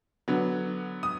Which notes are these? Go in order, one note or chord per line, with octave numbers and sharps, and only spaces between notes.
D3 F#3 B3
D#6